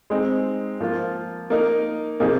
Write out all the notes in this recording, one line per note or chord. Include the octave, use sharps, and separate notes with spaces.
G#3 C4 D#4
F3 A#3 F4
A#3 D#4 A#4
C3 F3 A#3 D#4 G#4